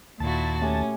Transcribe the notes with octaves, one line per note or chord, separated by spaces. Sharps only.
D#2 A#2 E4 F#4 A5
A3 C#4 G4 G#5